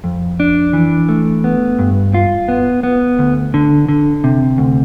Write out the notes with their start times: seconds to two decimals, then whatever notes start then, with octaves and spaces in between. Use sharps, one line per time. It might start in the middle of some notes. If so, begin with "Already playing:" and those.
0.04 F2
0.40 D4
0.73 E3
1.09 A3
1.44 B3
1.79 G2
2.14 F4
2.48 B3
2.83 B3
3.19 D2
3.54 D3
3.89 D3
4.24 C3
4.58 D2